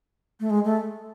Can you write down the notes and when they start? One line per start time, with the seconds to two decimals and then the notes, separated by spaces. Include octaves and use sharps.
0.40 A3
0.50 G#3
0.65 A3